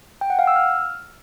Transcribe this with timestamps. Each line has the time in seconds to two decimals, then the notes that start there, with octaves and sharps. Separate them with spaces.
0.21 G5
0.30 F#5
0.39 F5
0.47 E6
0.56 F6